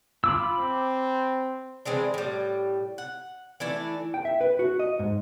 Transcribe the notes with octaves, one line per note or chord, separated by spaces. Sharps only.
F4 B5 D6 E6
C4
E3 G#3 C4 D4
A2 G3
F#5
E3 A3 D4 E4
G5
E5
B4
F#4
D#5
G#2